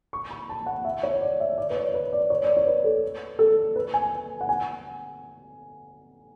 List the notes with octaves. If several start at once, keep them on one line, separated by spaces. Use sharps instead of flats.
C#6
B5
A5
F#5
E5
C#5
D5
E5
D5
B4
C#5
B4
D5
C#5
D5
C#5
B4
A4
A4
B4
G#5
F#5
G#5